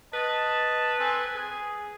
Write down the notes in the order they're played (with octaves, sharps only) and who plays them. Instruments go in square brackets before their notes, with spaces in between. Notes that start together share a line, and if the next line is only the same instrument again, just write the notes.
[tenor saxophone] B4 [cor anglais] D#5 [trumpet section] A5
[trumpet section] C4 A4 [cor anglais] G#5
[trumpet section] G#4